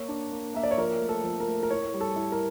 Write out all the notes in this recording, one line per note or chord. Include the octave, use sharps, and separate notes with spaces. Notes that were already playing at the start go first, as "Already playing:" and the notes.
Already playing: A#3 C#5
D4
A#3
A#3 E5
D5
C#5
F3 A#4
A3
A4
F3
A#4
A3
A#4
E4 C#5
G3
A4
E4
A#4